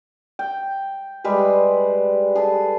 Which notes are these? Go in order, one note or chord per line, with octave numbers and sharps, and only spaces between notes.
G5
G3 G#3 B4
G#4 A4 B4